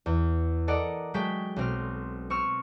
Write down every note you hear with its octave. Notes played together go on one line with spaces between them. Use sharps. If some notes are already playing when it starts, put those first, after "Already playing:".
E2
A4 A#4 D5 D#5 F#5 A#5
F#3 G#3 A3 A4 G5 B6
B1 C4 F6
C4 C#6 E6 F6